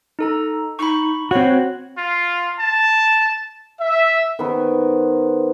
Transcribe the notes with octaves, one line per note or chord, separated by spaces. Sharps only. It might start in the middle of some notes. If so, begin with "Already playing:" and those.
D#4 A4 A#5
D#4 B5 C#6
C4 F#4 C#5
F4
A5
E5
D#3 B3 A#4 C5